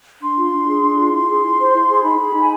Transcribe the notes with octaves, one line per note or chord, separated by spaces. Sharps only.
D4 C6
F4
D4
G#4
D4
F4
E4 C6
G#4
E4
C5
E4
G#4
D#4 B5
G#4
D#4
G#5